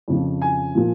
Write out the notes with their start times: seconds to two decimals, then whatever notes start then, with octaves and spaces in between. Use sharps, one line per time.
0.08 F2 C#3 F3
0.42 G#5
0.75 A#2 F3